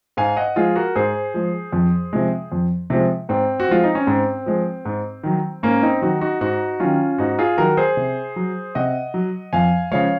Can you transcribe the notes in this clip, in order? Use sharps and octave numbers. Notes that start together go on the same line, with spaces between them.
G#2 F5 G#5
D#5 F#5
F3 G#3 F4 G#4
F#4 A#4
G#2 G#4 C5
F3 G#3
F2
C3 F3 G#3
F2
C3 F3 G#3
G#2 C4
F#4
F3 G#3 F4
D#4
C#4
G#2 C4
F3 G#3
G#2
D#3 F#3
G#2 A#3 C#4
C4 D#4
D#3 F#3 D#4 F#4
D#4 F#4
G#2 D#4 F#4
D#3 F#3 C#4 F4
G#2 D#4 F#4
F4 G#4
D#3 F#3 F#4 A#4
G#4 C5
C3
F#3
C3 D#5 F#5
F#3
F2 F5 G#5
C#3 F3 G#3 C#5 F5